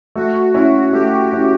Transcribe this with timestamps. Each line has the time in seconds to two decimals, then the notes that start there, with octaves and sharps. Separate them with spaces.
0.16 A3 F#4
0.54 C#4 E4 F#4
0.93 A3 G4
1.32 C#4 E4